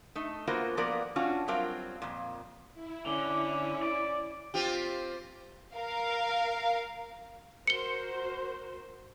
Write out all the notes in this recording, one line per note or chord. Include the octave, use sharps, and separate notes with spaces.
A3 D#4
A#3 B3 F4 F#4 A#4 C5
F3 A#3 B3 A#4 D5
C#4 D4 F4 F#4
F#3 G3 C4 F4 A#4 F5
F2 A#2
E4
D3 C#4 D6
D5
C4 F4 G4
A#4 F5
F#4 A#4 C5 C#7 G7